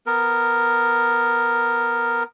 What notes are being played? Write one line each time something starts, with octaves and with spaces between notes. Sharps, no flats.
B3 A#4